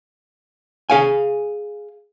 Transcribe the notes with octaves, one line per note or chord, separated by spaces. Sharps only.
G#4 F5 G#5